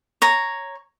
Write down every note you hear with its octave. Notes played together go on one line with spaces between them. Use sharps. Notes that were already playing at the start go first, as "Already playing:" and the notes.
C#5 A#5